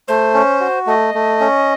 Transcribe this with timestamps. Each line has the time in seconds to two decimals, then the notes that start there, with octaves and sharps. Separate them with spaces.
0.08 A3 C5
0.34 C#4
0.61 F#4
0.87 A3 D#5
1.14 A3
1.41 C#4